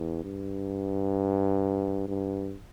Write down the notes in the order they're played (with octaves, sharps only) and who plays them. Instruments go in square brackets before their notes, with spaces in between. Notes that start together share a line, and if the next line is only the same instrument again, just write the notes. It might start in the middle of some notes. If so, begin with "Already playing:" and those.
Already playing: [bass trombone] E2
G2
G2